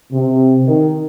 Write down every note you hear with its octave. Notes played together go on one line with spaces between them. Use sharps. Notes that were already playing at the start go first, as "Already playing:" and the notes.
C3
D#3